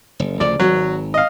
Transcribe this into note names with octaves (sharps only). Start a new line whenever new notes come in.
F#1
D2 C#3 F3 D5
G#1 F#3
D#5 F5